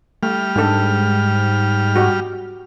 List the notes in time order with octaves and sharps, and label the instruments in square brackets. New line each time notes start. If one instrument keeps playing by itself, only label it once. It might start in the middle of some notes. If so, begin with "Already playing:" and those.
[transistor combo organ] G3 F6 [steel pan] A3
[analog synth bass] G#2 [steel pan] G#3 D4 A4
[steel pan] F#4 G4 D#5